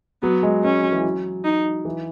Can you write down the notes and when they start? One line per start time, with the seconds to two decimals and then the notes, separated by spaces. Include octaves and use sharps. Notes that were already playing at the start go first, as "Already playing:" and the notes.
0.23 F#3 B3
0.43 G#3
0.63 G#3 C#4
0.83 F#3
0.92 E3
1.01 F#3
1.44 D#4
1.85 E3